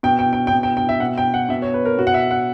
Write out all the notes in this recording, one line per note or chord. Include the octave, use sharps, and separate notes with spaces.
B2 G5
G5
G5
G5
B2
G5
G5
E5
B2 F#5
G5
F#5
B2 E5
C#5
B4
A#4
B2 F#4
F#5
E5
F#5